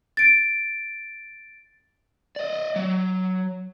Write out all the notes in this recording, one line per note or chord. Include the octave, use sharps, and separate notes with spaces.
A6 D7
D5 D#5
F#3